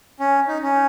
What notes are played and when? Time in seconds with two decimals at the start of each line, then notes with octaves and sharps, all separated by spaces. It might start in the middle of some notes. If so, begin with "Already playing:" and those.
0.20 C#4
0.48 D#4
0.63 C#4